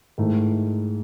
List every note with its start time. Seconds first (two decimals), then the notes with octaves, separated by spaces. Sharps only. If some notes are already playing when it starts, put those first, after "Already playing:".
0.18 G#2 D#3 A3 E4